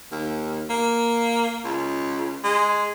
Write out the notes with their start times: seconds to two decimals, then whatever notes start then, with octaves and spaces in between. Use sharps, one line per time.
0.12 D#2
0.70 A#3
1.65 C#2
2.44 G#3